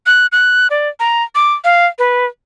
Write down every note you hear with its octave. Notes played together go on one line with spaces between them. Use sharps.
F#6
F#6
D5
A#5
D6
F5
B4